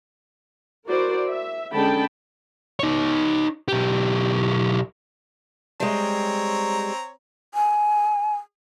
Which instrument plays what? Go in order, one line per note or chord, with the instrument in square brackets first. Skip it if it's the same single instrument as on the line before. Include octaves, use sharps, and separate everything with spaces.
[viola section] E4 F#4 A#4 C5 D5
E5
D3 G#3 C#4 G5 A5 B5
[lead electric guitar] D#4 C#5
B1 G4
[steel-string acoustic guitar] G3 G#3 [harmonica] C4 C#5 A#5
[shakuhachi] G#5